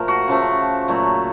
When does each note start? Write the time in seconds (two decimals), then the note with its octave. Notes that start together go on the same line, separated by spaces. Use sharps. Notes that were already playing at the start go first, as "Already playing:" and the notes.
Already playing: A#2 F3 A3 A#4
0.08 F#4
0.28 C#3 F3 A3
0.88 A#2 F#3 A3